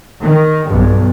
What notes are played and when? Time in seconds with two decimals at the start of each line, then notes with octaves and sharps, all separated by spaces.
0.20 D#3
0.65 B1 G2